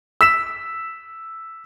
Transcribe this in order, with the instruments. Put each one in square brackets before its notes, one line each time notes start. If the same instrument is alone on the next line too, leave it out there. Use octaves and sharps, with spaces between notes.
[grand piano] E6 B6 E7